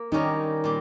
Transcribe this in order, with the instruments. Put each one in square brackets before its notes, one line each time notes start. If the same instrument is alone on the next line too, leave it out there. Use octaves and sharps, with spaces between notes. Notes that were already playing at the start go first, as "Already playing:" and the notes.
Already playing: [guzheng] A#3
[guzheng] D#3 G3 C#4 G4 A#4 [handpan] D#4
[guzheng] A#2 G3